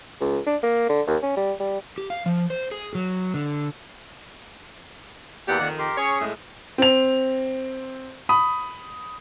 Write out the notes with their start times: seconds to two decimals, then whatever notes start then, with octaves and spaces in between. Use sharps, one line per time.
0.20 C#2
0.46 D4
0.63 A#3
0.89 D3
1.07 D#2
1.22 C#4
1.36 G3
1.60 G3
1.98 G4
2.10 F5
2.26 F3
2.50 C5
2.71 G#4
2.95 F#3
3.34 D3
5.48 E2 G2 A#3 G4 D5 F#5
5.61 F2 D#3
5.79 G4 A#4 C6
5.97 C#4 G#4 C#5
6.21 A2 G#3 A3
6.78 C4 F7
8.29 B5 D#6